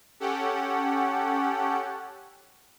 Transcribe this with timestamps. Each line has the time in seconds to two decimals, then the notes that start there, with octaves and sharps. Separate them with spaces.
0.20 C#4 G4 A4 F#5